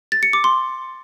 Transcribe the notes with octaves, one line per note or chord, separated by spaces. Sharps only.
A6
C#7
D6
C6